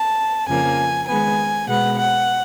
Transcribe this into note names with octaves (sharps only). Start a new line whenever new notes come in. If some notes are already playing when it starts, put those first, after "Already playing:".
Already playing: A5
F2 C#3 F3 A#3 G#5
D#3 G#3 B3 G#5
B2 G#3 B3 F#5
F#5